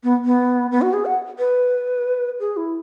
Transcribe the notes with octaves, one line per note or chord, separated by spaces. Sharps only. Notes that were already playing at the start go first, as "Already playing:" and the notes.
B3
B3
B3
F#4
G#4
F#5
B4
G#4
E4